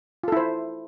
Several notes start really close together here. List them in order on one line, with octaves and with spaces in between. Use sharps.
F4 A4 E4 C5